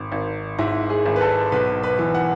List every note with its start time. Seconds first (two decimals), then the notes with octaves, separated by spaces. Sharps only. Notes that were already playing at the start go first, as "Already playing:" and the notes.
Already playing: G#1
0.12 G#1
0.59 G#2 E4
0.90 G#4
1.06 G#1
1.16 B4
1.21 A4
1.52 B1 B4
1.83 B4
1.99 E3
2.15 F#5